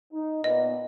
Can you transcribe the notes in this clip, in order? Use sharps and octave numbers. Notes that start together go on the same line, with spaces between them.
D#4
A#2 B3 D#5